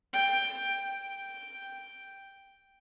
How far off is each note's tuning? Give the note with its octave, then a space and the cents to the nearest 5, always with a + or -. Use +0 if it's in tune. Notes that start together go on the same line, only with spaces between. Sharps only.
G5 +10
G5 +0